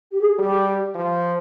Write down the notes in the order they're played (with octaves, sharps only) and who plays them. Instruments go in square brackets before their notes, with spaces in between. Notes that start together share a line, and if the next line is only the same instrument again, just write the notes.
[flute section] G4
G#4
[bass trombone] G3 [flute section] G4
[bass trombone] F3